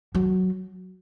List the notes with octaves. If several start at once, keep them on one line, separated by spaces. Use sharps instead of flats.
F#3